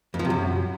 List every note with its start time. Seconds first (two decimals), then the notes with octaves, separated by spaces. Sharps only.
0.14 F2
0.19 F3
0.25 C3
0.30 F#2